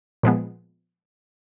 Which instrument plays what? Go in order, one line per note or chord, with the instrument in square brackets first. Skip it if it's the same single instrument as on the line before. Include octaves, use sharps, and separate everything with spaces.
[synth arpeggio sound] A#2 F3 G#3 B3